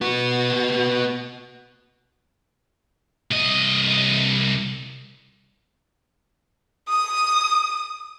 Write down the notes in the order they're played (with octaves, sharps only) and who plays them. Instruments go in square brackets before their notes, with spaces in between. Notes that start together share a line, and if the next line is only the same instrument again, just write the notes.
[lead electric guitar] B3 F#4
[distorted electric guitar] C2 D#5
[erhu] D#6